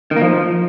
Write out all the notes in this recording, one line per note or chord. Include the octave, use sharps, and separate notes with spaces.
D#3
A#3
F3